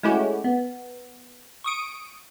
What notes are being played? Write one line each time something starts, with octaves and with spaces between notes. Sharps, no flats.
G#3 A3 C#4 E4 F#4 G4
B3
C#6 D#6 D7